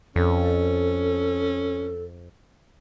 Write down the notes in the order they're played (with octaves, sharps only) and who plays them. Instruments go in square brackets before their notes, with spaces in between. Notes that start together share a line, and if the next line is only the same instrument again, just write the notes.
[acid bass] F2 [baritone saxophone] C#4 [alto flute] A4